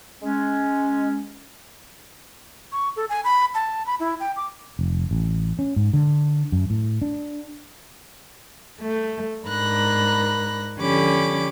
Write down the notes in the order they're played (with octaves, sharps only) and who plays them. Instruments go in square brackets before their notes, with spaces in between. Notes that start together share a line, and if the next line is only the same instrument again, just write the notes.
[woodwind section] G#3 C#4
[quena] C#6
A4
G#5
B5
A5
B5
E4
G5
D6
[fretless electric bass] F1
A1
C#4
G#2
D3
F#2
A2
D4
[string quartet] A3
G#2 D4 A#4 B5 F#6 A#6
D3 F3 C#4 G4 B5 D6